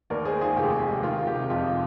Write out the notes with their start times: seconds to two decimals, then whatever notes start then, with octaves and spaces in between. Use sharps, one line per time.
0.10 D#2 A#4 D5
0.25 G#3 G#4 C5
0.41 D#3 F4 G#4
0.57 F1 G4
0.72 G#3
0.88 G#3
1.03 D#3 F4
1.19 D#3
1.27 G4
1.35 C3
1.50 F2 F4